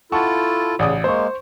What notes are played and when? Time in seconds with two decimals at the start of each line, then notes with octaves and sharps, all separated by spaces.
0.12 E4 F4 A4 F#5 A5 C#6
0.79 A1 C#3 D5 D#6
1.04 G#3 A#3 C5 C#6